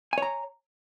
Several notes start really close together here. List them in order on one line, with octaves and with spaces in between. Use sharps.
G#5 C#5 A#5